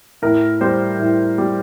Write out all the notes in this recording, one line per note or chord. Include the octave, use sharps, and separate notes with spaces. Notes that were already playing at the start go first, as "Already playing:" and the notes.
A2 A#4
G3 C5
A2
G3